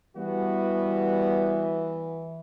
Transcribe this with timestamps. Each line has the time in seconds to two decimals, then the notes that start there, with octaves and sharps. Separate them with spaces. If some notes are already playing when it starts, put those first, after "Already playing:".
0.17 E3 G3 B3 F#4